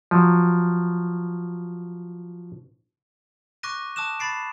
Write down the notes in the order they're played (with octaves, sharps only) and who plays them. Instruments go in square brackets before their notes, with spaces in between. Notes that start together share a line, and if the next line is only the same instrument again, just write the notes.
[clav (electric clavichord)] F3 F#3
[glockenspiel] C#6 D6 F#6 A#6 D#7
A5 D6 D#6 F#6 E7
B5 A6 C7 D7